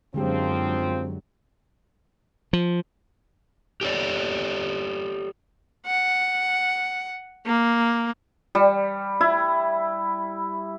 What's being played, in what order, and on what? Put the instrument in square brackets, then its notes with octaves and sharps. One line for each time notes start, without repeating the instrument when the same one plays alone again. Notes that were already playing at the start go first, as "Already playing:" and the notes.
[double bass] F#2 F#3 [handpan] D3 G#3 G4 [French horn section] F3 C4
[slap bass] F3
[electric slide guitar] G4 A4 C#5 D5
[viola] F#5
A#3
[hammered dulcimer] G3
E4